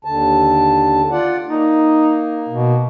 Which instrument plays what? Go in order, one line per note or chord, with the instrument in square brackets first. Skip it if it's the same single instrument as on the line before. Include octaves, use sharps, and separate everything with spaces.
[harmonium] D#2 D3 A5
F4 D5 F#5
[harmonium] A#3 [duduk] D#4
[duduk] B2